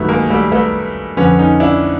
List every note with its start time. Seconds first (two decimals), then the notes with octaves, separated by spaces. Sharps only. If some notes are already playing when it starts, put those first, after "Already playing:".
Already playing: G2 D#3 F#3 A3 B3
0.09 G#3 A#3
0.30 G3 A3
0.52 A3 B3
1.17 F2 D3 F3 B3 C#4
1.39 C#4 D#4
1.60 D4 E4